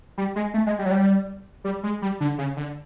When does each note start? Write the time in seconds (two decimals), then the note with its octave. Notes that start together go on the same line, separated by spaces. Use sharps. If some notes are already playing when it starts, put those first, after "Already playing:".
0.18 G3
0.36 G#3
0.54 A3
0.67 G#3
0.79 G3
0.86 F#3
0.91 G3
1.64 G3
1.83 G#3
2.02 G3
2.20 D3
2.38 C#3
2.57 D3